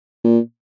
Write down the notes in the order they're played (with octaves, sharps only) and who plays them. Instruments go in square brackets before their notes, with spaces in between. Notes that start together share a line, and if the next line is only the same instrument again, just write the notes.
[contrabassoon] A#2